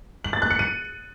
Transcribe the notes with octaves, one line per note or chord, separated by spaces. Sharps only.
F#7
A6
F#6
C#7
D#7